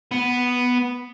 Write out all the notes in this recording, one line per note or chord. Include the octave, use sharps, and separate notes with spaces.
B3